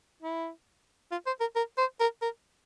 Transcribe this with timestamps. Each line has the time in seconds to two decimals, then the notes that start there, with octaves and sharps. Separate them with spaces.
0.22 E4
1.11 F4
1.27 C5
1.40 A#4
1.56 A#4
1.78 C5
2.00 A#4
2.22 A#4